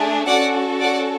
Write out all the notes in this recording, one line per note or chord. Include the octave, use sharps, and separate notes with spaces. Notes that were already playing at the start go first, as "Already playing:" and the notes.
Already playing: A3 D4 G#4
C#4 F#4 A4 D5 F#5
D5 F#5